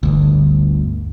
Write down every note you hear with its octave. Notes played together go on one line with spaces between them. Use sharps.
G1 D2